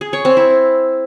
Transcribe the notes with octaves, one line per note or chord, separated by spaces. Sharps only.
G#4
C#5
C4
E4